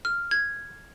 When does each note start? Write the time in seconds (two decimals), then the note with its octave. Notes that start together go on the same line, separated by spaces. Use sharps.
0.05 F6
0.31 G#6